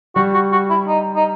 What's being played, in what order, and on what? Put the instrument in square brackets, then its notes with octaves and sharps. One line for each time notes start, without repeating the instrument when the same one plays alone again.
[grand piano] G3 [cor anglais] F#4
[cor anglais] F#4
F#4
E4
D#4
D#4